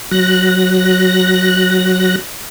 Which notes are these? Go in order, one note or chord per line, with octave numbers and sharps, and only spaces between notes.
F#3 F#6 A#6